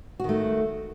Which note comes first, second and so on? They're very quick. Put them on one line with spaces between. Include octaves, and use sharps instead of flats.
F#4 D#3 A3